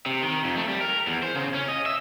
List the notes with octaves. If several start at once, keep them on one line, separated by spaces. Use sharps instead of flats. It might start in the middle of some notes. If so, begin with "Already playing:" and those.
C3
D#3
F2
A3
G3
A#4
E2
C5
C#3
C#4
D#5
E5